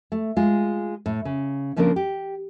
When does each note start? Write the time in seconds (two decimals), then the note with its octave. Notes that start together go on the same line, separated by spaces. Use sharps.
0.12 A3
0.37 G#3 F4
1.06 A2
1.25 C#3
1.76 C#3 F3 A#3 C4 D4 A#4
1.96 G4